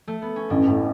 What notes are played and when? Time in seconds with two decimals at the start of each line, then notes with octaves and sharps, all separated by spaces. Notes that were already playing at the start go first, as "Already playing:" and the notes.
0.08 A3
0.22 B3
0.36 C#4
0.50 A1 D4
0.68 A2